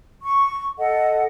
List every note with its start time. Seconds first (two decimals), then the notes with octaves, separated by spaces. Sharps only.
0.23 C#6
0.78 A4 D#5 F#5